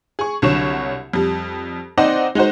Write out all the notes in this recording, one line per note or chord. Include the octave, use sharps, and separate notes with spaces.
G#4 C#6
C2 D3 F#3 C#5 E7
F2 G3
C4 D#4 C5 D5 D#5 F#5
G#3 D#4 F#4 C5